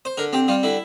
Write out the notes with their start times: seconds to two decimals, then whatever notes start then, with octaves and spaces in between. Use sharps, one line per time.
0.05 C5
0.17 D3 A#4
0.33 C4 G4
0.48 G3 F4
0.63 D3 E4